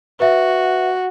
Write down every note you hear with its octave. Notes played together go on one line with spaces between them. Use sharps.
F#4 B4 E5